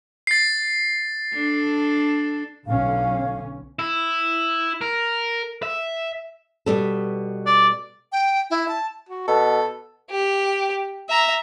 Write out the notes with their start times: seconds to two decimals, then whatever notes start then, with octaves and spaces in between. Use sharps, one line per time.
0.27 A6 C7
1.34 D4 A4
2.67 B1 D3 C#4 F5
3.79 E4
4.81 A#4
5.63 E5
6.66 B2 G3 A4
7.46 D5
8.12 G5
8.51 E4
8.68 A5
9.09 F#4
9.28 B2 A4
10.10 G4
11.09 E5 A#5